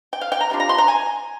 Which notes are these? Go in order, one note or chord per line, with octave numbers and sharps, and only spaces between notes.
G5
F5
G5
A#5
C3 G3 D4 F4
A#5
C6
A#5
G#5